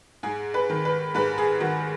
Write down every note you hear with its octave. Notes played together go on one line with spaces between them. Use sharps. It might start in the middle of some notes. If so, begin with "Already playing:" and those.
G#2 G#4
B4
D#3
B4
G#2 B4
G#4
D#3 F#4